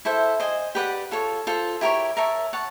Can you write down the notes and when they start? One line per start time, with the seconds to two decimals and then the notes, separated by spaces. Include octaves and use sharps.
0.05 E4 A4 C5 E5
0.40 C5 D#5 G#5
0.75 G4 B4 D5 F#5
1.11 F4 A4 C#5
1.47 F4 A4 C5
1.81 E4 G4 A#4 C#5
2.17 A#4 C#5 E5 A5
2.53 C#5 F#5 A5